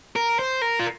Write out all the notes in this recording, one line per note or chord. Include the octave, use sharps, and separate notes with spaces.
A#4
C5
A#4
F4